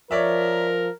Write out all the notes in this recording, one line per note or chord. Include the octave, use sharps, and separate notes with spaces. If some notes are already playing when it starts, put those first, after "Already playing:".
F3 A#4 C#5 D5 E5